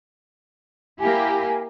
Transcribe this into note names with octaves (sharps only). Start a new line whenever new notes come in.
A#3 E4 G4 G#5